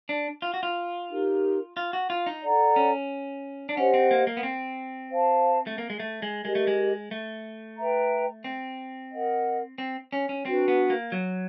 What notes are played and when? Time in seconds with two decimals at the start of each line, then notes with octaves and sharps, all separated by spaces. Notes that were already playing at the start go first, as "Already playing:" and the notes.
0.09 D4
0.42 F4
0.54 F#4
0.63 F4
1.09 D#4 G4 A#4
1.77 F4
1.93 F#4
2.10 F4
2.26 D#4
2.43 A4 D5 F#5 A#5
2.76 C#4
3.69 D4
3.76 C#4 G4 C5 D#5 F#5
3.94 C4
4.11 A#3
4.27 A#3
4.37 B3
4.43 C4
5.11 C5 F5 A5
5.67 A3
5.78 A#3
5.90 G#3
6.00 A3
6.22 G#3
6.44 G#3 G4 A#4 D#5
6.55 A3
6.67 G#3
7.11 A3
7.78 B4 E5 G5 A#5
8.44 C4
9.12 A#4 D#5 F#5
9.78 C4
10.13 C#4
10.29 C#4
10.45 C4 D4 F#4 B4
10.68 B3
10.90 A#3
11.12 F#3